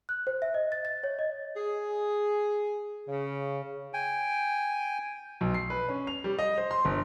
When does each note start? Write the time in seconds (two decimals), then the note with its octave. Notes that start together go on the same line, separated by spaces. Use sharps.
0.09 F#6
0.27 C5
0.42 E5
0.54 D#5
0.72 A6
0.85 A6
1.04 C#5
1.19 D#5
1.57 G#4
3.08 C#3
3.93 G5 G#5
5.41 B1
5.54 C7
5.70 B4
5.89 C#4
6.07 F7
6.24 G3
6.39 D#5
6.58 C5
6.71 C6
6.85 G1